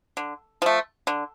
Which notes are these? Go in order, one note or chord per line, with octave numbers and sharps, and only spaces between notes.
D3
F3 A3
D3